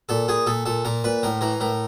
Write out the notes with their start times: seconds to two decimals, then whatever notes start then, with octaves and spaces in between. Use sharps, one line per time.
0.09 A#2 A4
0.28 A#2 G#4
0.46 A#2 A4
0.66 A#2 A4
0.85 A#2 A#4
1.04 A#2 B4
1.23 A2 A#4
1.41 E3 A#4
1.60 A2 A#4